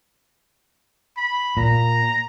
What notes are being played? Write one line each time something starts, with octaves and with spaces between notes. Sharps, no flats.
B5
A#2 A#5